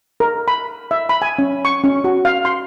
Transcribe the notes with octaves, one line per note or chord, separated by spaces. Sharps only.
A#4
B5
E5
B5
G#5
C#4
C#6
C#4
F#4
F5
C6